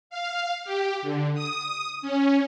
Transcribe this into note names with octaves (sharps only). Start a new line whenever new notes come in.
F5
G4
D3
D#6
C#4